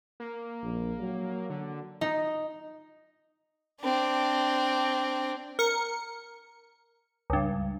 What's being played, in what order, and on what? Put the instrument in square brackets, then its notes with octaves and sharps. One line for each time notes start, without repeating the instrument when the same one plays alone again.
[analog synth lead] A#3
[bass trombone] A#1
F#3
[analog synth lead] D3
[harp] D#4
[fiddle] C4 D4
[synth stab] A#4 C#7
C#2 G2